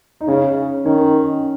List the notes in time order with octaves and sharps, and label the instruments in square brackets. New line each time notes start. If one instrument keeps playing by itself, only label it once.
[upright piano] D#4
[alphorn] C#3 [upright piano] C#4
[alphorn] D#3 [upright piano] C#4